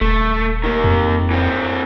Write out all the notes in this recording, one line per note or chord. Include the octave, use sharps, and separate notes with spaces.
D#1 A3
D#3 A#3
F2
E3 C4